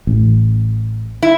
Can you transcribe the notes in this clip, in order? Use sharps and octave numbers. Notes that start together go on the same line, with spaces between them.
A1
E4